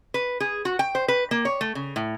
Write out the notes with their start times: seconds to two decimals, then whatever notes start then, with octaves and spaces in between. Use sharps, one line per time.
0.14 B4
0.40 G#4
0.65 F#4
0.79 G5
0.95 C5
1.08 B4
1.31 A#3
1.45 C#5
1.61 A3
1.75 C#3
1.96 A2